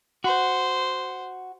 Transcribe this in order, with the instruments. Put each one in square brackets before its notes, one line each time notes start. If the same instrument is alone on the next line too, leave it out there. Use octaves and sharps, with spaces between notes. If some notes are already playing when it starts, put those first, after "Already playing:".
[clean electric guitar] F#4 [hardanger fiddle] C5